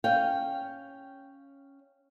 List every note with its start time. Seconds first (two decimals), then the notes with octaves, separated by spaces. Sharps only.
0.04 C#4 F5 G5